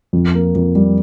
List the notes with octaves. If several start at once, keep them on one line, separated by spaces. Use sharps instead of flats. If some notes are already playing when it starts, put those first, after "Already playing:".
F2
A#3
F2
G3